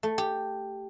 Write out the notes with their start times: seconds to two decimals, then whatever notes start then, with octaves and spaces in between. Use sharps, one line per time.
0.03 A3
0.18 G4